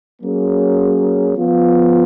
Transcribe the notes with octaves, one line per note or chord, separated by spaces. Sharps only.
F#3 A#3 C#4 G#4
F3 B3 F4